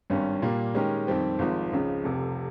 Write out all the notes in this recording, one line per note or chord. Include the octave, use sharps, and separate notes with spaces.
G#1 G2 G3 C#4
A#2 G3 A#3
D#3 G#3 C#4 G4 A#4
F2 D#3 G3 C4 G4
G#1 G#2 F3
C#2 C#3 F3
F1 F2 C3